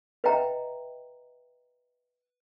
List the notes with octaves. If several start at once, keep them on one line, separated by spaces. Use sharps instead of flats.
B4 D#5 E5 F#5 G5 A#5